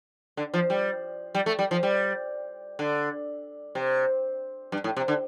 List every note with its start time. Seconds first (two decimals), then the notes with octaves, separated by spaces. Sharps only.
0.37 D3
0.54 F3
0.70 G3
1.35 G3
1.46 A3
1.59 G3
1.71 F3
1.83 G3
2.79 D3
3.75 C3
4.72 G2
4.84 A2
4.97 C3
5.08 D3